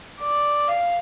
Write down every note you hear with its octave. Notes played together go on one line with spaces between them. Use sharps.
D5
F5